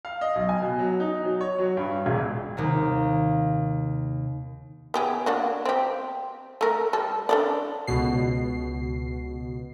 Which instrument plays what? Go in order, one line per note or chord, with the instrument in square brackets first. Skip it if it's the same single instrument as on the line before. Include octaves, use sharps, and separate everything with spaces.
[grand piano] F5
D#5
B1
G#5
B2
F#3
D#4
F#3
C#5
F#3
G2
E1
[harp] D#2 C3 A#3
[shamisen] B3 G4 G#4
A#3 D4 F#4
C4 G4
A3 A#4
G3 A4
D4 A4 D5
[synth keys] C#2 B2 C7